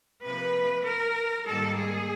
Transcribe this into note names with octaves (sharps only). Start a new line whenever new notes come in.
C3 F3 A#3 B4
A#4
G#2 D#3 G3 A#3 A4
G#4